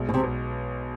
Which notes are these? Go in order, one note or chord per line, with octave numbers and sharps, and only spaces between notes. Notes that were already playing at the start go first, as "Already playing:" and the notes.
Already playing: B1 G#3
B2
C3
B1